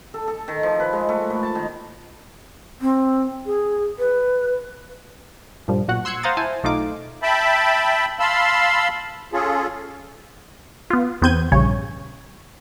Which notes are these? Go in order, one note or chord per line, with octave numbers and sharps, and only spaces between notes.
A4
A4
D#3
F3
B4
G#3
A3
A#2
A5
D#3
C4
G#4
B4
G2 A#2 F3 G3
B1 A#2 F#4 F#5
C6 E6 F#6 G#6 C#7
C5 F5 F#5 A#5 D#6 A6
E4 C5 G#5 A5
B1 A3 D#4 F4 D6
E5 G5 A5 B5
F5 A5 B5 C6 E6
C#4 F4 G#4 A4
B3 F4
E2 B3 C4 G6 G#6 D#7
A#1 G2 C#3 C#5